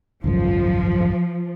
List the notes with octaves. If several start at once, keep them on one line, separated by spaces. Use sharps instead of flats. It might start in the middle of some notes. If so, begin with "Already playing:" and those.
G#1 C#2 F#2 F3